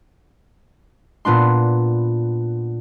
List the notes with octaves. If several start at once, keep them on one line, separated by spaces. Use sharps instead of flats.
A#2 B3 D4 C6